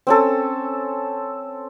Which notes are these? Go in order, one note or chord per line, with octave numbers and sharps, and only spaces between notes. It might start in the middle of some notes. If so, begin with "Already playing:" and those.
C4 C#4 A4